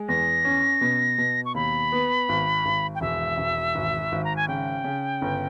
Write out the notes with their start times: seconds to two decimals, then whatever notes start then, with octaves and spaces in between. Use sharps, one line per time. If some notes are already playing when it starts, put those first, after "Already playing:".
Already playing: G#3
0.08 E2 A#6
0.45 C#4
0.81 B2
1.18 B2
1.45 C#6
1.54 D#2 B5
1.92 B3
2.29 G#1
2.65 G#1
2.95 G5
3.01 E1 E5
3.38 E1
3.75 G#1
4.12 G#1
4.24 A#5
4.36 G#5
4.48 C#3 G5
4.84 C#3
5.22 G1